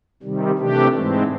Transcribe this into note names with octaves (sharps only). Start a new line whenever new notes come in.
C3 D#3 G3
C3 E3 A3 D4 G4
G#2 E3 G#3 C4